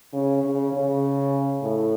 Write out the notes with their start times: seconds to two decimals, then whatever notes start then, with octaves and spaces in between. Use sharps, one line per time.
0.13 C#3
0.43 C#3
0.73 C#3
1.62 A2